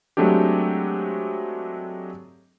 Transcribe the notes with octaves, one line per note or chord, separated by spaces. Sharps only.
F#3 G#3 A3 C4 D4 G4